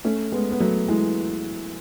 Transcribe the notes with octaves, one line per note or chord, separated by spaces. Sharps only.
A3 C#4
G#3 B3
B3
F#3 A3
E3 G#3